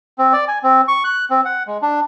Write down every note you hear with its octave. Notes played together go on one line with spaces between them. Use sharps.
C4
D5
G#5
C4
C#6
F#6
C4
F#5
G#3
D4